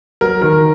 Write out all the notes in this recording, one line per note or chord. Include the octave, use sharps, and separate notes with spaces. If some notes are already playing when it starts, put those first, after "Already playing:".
F#3 A#4
D#3 A#4